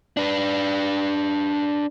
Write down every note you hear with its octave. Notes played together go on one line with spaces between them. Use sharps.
D4 B4